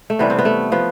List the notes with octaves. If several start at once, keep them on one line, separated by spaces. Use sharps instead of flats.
A3
C3 E3 G3 B3
C4
B3
A3
F3 B3